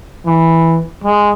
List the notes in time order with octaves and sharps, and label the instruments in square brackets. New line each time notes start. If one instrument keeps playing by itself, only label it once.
[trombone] E3
G#3